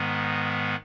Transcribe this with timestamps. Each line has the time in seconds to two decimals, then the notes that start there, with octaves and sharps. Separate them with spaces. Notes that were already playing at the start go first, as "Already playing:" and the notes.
Already playing: G#2 D#3 G#3 B3